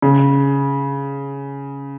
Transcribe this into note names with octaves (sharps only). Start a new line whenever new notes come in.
C#3